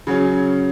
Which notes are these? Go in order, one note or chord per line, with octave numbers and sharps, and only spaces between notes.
C#3 F#3 C#4